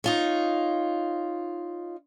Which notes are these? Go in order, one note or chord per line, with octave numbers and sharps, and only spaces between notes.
D#4 F4 C#5